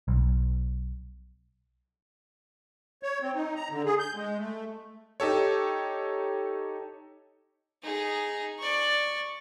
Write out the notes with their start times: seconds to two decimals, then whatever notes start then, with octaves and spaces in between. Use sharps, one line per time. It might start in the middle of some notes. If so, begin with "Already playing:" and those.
0.08 B1
3.03 C#5
3.21 C4
3.34 D#4
3.55 A#5
3.71 D3
3.85 G#4
3.99 G6
4.15 G#3
4.38 A3
5.20 D#4 G4 A4 C#5
7.83 D#4 G#4
8.59 D5 C#6